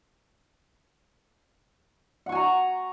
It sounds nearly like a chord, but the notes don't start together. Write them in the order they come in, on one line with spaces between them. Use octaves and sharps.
F#5 C#6 G#5 A#5